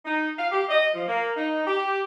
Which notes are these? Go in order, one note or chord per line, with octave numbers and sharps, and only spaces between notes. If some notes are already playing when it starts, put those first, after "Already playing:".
D#4
F5
G4
D#5
F3
A#3
D#4
G4